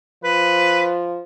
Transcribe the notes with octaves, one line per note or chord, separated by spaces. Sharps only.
F3 B4